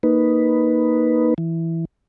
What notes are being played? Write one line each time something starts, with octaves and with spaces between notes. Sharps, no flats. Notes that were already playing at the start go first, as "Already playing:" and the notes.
A#3 D#4 B4
E3